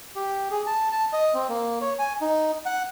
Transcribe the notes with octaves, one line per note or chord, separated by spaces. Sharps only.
G4
G#4
A5
A5
D#5
C4
A#3
C#5
G#5
D#4
F#5